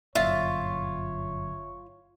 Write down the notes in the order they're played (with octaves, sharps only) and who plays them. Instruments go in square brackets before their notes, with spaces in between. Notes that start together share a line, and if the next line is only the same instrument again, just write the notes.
[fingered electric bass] G1 F#2 A#2 [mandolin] F4 [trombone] C#5 [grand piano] E5